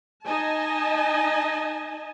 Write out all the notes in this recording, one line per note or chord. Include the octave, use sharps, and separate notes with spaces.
D#4 D#5 G#5 A5